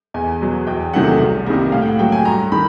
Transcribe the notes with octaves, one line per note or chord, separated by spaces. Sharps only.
E2 G#5
B2 F#3
E2 G5
C3 D#3 F#3 A3 F#5
C2
C3 D#3 G3 A#3
A2 F5
G5
F#5
F#3 A#3 G5
G#5
G2 A#5
D#3 B5